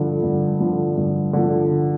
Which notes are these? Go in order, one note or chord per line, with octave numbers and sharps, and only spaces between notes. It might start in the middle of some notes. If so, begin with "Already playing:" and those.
Already playing: G2 D3 F3
G2
D3 F3
G2
D3 F3